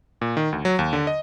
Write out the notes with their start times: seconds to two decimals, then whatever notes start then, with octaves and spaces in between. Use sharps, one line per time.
0.21 A#2
0.37 D#3
0.53 D2
0.65 F#3
0.79 D#2
0.93 D3
1.07 D#5